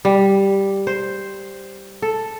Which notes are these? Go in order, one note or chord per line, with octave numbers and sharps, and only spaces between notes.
G3
C5
A4